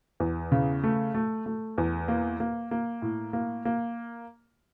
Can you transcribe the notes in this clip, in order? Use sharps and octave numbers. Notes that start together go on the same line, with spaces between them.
E2
C#3
A3
A3
A3
E2
A#3
A#3
A#3
A2
A#3
A#3